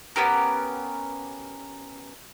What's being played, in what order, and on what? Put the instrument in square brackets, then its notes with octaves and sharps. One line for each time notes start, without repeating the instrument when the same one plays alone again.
[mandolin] B3 C#4 G4 A#4